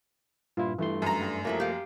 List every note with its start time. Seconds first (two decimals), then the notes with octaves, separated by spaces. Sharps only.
0.57 G2 A#2 E4 F4
0.79 G2 E3 A3 C6
1.02 F#2 A#5
1.21 G3
1.45 F3 F#3 A3 A#3 E4 G4
1.60 G4 F5